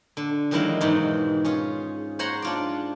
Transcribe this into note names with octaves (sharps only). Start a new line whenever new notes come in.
D3
E2 D#3 F#3 G#3 E4 F5
E2 G#2 B2 D#3
C#4 F4 G#4
C5 C#5 F#5 A#5 C6
D4 F4 D5